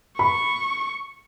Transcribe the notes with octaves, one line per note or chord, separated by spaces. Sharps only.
B5 C#6